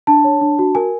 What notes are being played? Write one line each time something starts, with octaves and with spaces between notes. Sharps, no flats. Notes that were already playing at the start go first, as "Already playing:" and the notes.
D4 A5
C#5
D4
F#4
A#4 G#5